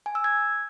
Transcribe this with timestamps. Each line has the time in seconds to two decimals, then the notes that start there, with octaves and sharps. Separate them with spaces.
0.06 G#5
0.15 E6
0.24 G#6